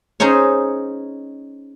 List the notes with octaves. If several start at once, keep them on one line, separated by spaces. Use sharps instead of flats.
C#4 D#4 G#4 C5 C#5